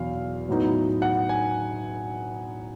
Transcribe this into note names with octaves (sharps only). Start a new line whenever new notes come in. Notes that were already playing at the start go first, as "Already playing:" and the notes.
Already playing: E2 B2 F#3 F5
A2 F#3 B3 D#4
F#5
G#5